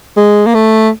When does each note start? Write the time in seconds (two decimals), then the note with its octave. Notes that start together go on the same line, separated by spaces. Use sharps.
0.16 G#3
0.46 A#3
0.54 A3